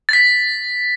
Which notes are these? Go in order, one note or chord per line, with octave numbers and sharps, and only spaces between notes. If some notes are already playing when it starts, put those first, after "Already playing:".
A6
B6